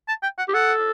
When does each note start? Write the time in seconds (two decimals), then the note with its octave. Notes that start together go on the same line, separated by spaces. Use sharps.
0.08 A5
0.23 G5
0.38 F#5
0.48 G4
0.54 A4 F#5